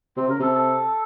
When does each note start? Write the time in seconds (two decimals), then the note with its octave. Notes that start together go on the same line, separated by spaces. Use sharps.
0.16 C3 C4
0.29 C#3 A#4
0.40 C3 A4
0.55 A4